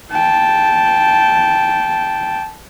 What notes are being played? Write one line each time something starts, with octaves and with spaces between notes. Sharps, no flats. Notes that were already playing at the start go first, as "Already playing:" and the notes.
G5 A5